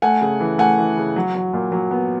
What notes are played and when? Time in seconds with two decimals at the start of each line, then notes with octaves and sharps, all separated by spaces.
0.02 A3 F#5 G#5
0.21 C#3
0.40 E3
0.58 A3 F#5 G#5
0.78 E3
0.97 C#3
1.16 F#3
1.35 F#3
1.53 A#2
1.72 F#3
1.91 B3